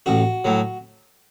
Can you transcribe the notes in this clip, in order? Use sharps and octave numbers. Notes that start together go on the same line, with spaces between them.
A1 F#4
A2 F#3